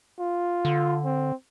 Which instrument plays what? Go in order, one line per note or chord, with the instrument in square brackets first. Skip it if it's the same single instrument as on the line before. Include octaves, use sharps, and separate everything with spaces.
[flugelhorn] F4
[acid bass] D3
[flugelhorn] C4